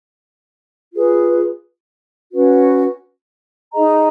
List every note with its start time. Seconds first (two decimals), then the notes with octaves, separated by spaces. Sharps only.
0.93 F4 G#4 B4
2.33 C#4 F#4 B4
3.74 D#4 G#4 D#5 A#5